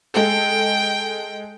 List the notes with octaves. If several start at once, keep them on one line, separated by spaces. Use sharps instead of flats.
G#3 A4 G5